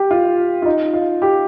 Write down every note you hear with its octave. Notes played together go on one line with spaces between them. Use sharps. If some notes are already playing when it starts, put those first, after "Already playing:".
Already playing: G4
F4
F4
D#4
F4
G4